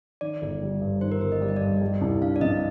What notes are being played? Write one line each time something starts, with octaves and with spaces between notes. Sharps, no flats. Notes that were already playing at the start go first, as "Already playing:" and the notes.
D#3 D5
G1
G3
G2
D#3 C5
A#4
G1 C5
D#5
G3 D5
D#5
G2 D5
G3
C2
D4 F5
D5
C3 D#5